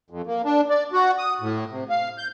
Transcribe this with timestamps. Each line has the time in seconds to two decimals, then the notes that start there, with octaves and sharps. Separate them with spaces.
0.10 F2
0.27 A#3
0.45 D4
0.70 D5
0.93 F#4
1.18 D#6
1.41 A2
1.71 C3
1.90 F5
2.18 G6